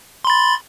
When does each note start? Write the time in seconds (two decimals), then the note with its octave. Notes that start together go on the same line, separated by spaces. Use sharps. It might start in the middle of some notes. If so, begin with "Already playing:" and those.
0.25 C6
0.27 B5
0.30 A6